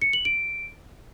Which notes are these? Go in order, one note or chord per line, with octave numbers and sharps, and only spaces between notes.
C#7
F#7
D7